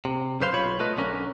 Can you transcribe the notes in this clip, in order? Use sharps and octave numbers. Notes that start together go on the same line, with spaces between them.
C3
F#2 C#3 B4 C5 F5 C6
B1 F4 C#5 B5
A3 F4 B4 D#5
B1 D3 C#4 A#4